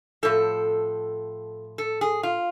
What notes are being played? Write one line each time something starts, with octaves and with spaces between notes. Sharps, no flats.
A2 F3 A4
A4
G#4
F4